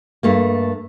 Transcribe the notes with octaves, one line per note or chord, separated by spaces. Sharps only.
G2 A3 A#3